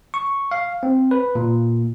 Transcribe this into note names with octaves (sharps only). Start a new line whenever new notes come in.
C#6
F5
C4
B4
A#2